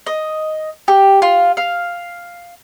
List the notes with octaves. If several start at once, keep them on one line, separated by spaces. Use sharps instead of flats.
D#5
G4
F4
F5